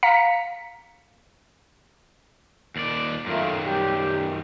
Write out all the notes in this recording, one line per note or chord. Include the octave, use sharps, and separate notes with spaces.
F5 A#5 B6 C#7
D#2 D5
F#2 D#3 A3 F4
G3 G4